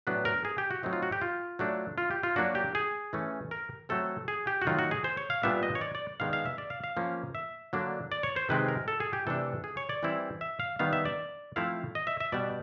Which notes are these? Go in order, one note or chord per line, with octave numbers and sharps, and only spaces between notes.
A2 F#3 B3 D4 B4
A#4
G#4
G4
F#4
F#3 A3 C4 D#4
F4
F#4
G4
F4
F#3 A3 D4
F4
G4
F4
F#3 A#3 D4 F#4
G4
G#4
E3 A3 C#4
A#4
F#3 A3 C4 A4
G#4
G4
F#4
D#3 F#3 A3 F4
F#4
G#4
C5
C#5
F5
A#2 G3 B3 D4 E5
D#5
C#5
D5
D5
D#3 G#3 B3 D4 F5
F5
E5
D5
F5
F5
F3 A#3 C#4
E5
D3 F#3 A#3 D4
D5
C#5
C5
C3 D#3 G#3 C4 B4
A#4
A4
G#4
G4
C3 E3 A3 D4 A4
G#4
C#5
D5
E3 G3 C4 E4
E5
F5
D#3 G3 B3 F5
E5
D5
F3 A3 C4 E4 F5
D#5
E5
E5
B2 G3 B3 D5